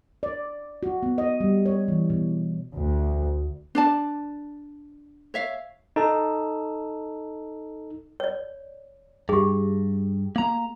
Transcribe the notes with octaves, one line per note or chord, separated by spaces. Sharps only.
D5
F#4
B3
D#5
G3
C#5
E3
B2
D2
D4 D5 A5
C#5 E5 F5
D#4 A4 A5
C#5 D5
G2 G4 G#4
A#3 A#5